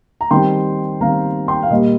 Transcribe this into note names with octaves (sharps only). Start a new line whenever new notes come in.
A#5
D#3 G3 C4 G5 C6
D#3 G3 C4 F5 A#5
G5 C6
F5
A#2 G3 A#3 D#5